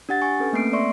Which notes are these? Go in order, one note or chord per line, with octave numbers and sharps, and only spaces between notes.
D4 G4 F#5 A6
G#5 C#6
C#4 A4 B4
A3 A#3 C4 C7 D7
D5 E5 C6 C#6